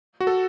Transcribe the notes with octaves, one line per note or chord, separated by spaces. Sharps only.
F#4
A4